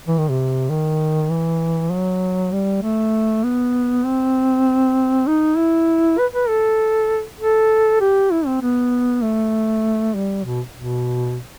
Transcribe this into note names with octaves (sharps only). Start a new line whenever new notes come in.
E3
D#3
C3
D#3
E3
F#3
G3
A3
B3
C4
D#4
E4
B4
B4
A4
A4
G4
E4
C4
B3
A3
G3
B2
B2